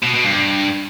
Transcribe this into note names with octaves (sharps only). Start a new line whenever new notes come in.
B2
B2
G2